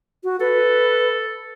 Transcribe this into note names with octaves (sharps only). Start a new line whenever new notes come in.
F#4
A4 B4